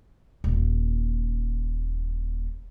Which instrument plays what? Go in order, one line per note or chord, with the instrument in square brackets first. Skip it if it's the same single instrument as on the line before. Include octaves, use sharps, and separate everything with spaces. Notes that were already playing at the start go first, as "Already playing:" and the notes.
[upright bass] D#1 A#3